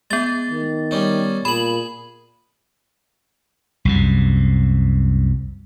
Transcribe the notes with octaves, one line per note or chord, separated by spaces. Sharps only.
G#3 B3 A6
D#3
G3 C#4 D#4
A#2 G#4 B5 F#7
C2 F#2 C3